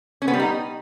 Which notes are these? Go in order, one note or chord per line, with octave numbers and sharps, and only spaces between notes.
C#4
B3
G3
D#4